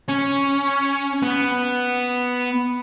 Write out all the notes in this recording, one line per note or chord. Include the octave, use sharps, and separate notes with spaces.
C#4
B3